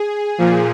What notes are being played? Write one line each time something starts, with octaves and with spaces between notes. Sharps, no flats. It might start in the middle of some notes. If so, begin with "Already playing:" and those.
Already playing: G#4
A#2 F3